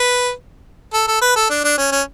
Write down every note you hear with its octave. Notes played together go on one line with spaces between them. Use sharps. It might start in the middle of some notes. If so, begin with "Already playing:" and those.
Already playing: B4
A4
A4
B4
A4
D4
D4
C#4
C#4